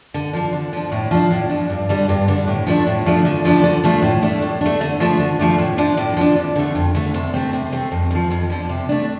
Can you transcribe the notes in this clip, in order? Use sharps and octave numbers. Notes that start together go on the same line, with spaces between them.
D3
F3 D4
D3
F3 D4
A2
F3 D4
A2
F3 D4
G2
D3 G3 D4
G2
D3 G3 D4
A2
F3 A3 D4
A2
F3 A3 D4
D3
F3 A3 D4
D3
F3 A3 D4
A2
A3 D4
A2
A3 D4
D3
F3 A3 D4
D3
F3 A3 D4
A2
F3 D4
A2
F3 D4
F2
D3 A3
F2
D3 A3
C3
A3 C4
C3
A3 C4
F2
D3
F3
F2
D3 F3
C3
A3 D4